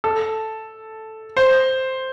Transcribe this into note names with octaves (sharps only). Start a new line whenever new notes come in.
A4
C5